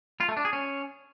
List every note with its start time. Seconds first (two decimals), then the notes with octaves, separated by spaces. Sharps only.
0.20 F4
0.29 A3
0.37 D4
0.45 G#4
0.53 C#4